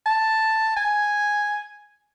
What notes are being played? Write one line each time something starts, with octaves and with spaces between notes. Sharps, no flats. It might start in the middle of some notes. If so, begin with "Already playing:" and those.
A5
G#5